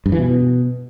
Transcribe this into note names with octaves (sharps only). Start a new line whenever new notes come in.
G2
E3
B2